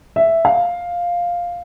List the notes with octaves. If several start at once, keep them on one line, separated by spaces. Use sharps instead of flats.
E5
F5